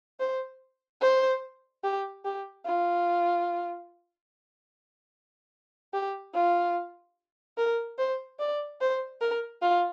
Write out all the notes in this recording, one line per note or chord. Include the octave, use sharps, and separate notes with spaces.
C5
C5
G4
G4
F4
G4
F4
A#4
C5
D5
C5
A#4
F4